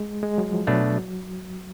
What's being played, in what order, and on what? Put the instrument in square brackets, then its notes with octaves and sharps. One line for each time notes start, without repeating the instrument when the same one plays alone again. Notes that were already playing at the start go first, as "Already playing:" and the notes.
Already playing: [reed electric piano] G#3
G#3
F#3
F3
[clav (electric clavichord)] B2 A3 D4 [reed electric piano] F#3